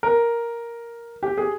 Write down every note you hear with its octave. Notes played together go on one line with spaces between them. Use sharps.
A#4
G4
G#4